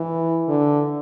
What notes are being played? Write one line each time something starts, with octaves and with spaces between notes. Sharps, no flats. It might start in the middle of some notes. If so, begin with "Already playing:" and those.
Already playing: E3
D3